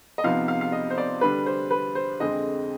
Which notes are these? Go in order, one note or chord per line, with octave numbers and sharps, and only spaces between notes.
D#5
C3 F3 B3 D#4 F5
F5
F5
D#5
C5
D5
D3 G3 D4 B4
C5
B4
C5
F2 D3 G#3 C4 D#5